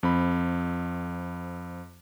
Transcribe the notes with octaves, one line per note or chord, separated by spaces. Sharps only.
F2 C4 B5